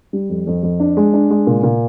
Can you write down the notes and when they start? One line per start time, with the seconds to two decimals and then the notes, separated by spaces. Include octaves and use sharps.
0.13 G3
0.30 F2
0.47 F2
0.63 F2
0.80 D4
0.97 G#3
1.13 D4
1.30 G#3
1.47 A#2
1.63 A#2